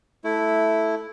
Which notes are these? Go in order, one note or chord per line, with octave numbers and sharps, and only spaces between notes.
A3 E4